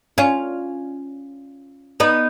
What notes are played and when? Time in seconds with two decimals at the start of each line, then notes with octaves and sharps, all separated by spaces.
0.18 C#4 F4
2.00 B3 D#4